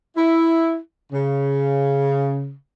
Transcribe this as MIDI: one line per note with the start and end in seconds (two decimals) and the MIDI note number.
0.17 0.77 64
1.13 2.53 49